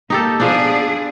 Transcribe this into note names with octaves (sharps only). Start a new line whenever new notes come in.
A#3 D#4 G4 A4
F3 B3 D4 G#4 D5